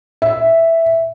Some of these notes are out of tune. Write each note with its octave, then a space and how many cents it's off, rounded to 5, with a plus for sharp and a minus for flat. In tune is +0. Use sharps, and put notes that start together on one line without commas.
E5 +0